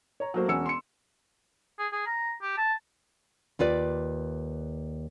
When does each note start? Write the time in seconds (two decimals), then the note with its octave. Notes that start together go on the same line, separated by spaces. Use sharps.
0.20 C#5 A#5
0.34 F#3 A3 A#3 F#4 C5
0.48 E1 C#4 F#4 F#5 E6 C#7
0.66 C6 C#7
1.79 G#4
1.92 G#4
2.06 A#5
2.42 G4
2.57 A5
3.59 D#2 F4 B4 D5